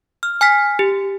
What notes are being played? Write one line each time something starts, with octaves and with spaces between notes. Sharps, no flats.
F6
G#5 F6 B6
G4